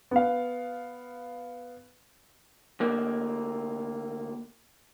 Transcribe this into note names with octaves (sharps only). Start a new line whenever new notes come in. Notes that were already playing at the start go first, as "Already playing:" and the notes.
B3 F5
D2 A#3